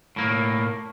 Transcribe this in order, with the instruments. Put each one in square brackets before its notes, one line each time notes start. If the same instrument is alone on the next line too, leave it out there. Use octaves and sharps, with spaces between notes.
[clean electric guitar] A2 A#3